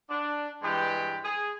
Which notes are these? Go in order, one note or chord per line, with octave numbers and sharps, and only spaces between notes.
D4
G2 E3 G#3 G4
G#4